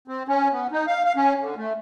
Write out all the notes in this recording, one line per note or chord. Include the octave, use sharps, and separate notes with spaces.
C4
C#4
B3
D#4
F5
F5
C#4
D3
A3